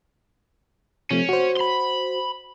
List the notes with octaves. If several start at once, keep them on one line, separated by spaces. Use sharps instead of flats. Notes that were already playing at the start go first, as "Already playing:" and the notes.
C3 F3 A3 C#4
F#4 C5
B5 C6